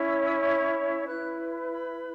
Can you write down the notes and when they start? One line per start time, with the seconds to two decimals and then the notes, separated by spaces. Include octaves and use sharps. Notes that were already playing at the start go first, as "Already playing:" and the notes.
Already playing: C#4 E4 C#5
0.09 E6
0.25 E6
0.42 G#6
1.07 E4 B4 F#6
1.72 B5